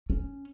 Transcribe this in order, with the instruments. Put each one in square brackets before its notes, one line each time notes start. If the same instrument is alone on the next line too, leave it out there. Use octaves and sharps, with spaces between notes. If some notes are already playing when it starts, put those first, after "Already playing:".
[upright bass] C#4